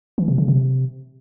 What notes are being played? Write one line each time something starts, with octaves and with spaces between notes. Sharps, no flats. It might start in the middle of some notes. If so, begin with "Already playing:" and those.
E3
C3
C#3
C3